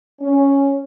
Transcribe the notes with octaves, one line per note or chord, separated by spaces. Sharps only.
C#4